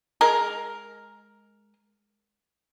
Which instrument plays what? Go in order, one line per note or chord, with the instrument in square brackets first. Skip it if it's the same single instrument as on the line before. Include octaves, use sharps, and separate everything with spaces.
[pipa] G#3 A#4